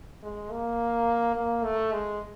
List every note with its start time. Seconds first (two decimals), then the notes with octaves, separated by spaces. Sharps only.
0.24 G#3
0.51 A#3
1.36 A#3
1.64 A3
1.92 G#3